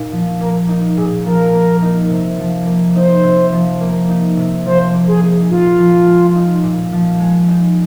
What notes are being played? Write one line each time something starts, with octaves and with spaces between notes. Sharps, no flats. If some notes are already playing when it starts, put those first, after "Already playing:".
Already playing: A#2 A#3 D#4
F3
A#3 A#4
D#4
A#2 G#4
F3 A#4
A#3
D#4
C3
F3
A#3
D#4 C5
C3
F3
A#3
D#4
C3
F3 C5
A#3
G#4
D#4
A#2 F4
F3
G#3
D#4
A#2
F3
G#3
D#4